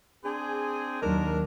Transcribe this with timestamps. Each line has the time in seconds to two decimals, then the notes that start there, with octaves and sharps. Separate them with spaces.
0.24 C4 D4 G#4
1.02 D#2 F#3 D4 D#4 A#4